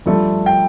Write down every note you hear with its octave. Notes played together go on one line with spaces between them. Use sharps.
G2 F3 A3
G5